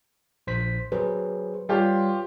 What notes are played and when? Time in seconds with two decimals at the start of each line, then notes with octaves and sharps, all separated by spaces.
0.47 A#1 C5 B6
0.92 F#3 G#4 B4 C5
1.69 G3 F4 G4 C#5 C6